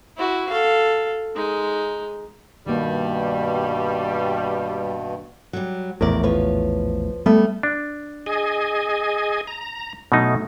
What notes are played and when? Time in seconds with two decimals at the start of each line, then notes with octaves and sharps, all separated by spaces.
0.17 E4 F#4
0.49 A4 F5
1.35 G#3 D#4
2.67 G2 B2 D#3 G3 A#3
5.53 F#3 G3
6.01 A#1 E2 A2 A#4 D5
6.23 F3 B4 C#5
7.26 G3 A3 B3
7.63 D4
8.26 G#4 D#5 G#5
9.47 A#5
10.12 B2 F#3 A3 D#4